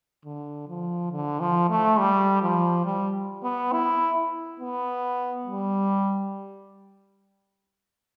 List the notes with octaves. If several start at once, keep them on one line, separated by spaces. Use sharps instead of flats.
D3
F3
D3
F3
A3
G3
F3
G3
B3
E4
B3
G3